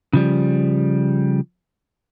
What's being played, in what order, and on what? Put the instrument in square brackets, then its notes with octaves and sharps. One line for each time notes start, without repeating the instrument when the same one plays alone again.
[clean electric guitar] C#3 F3 G3